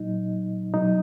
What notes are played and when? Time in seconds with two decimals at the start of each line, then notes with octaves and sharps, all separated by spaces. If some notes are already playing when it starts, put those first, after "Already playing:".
Already playing: A#2 F#3 D#4
0.74 B2 F#3 D#4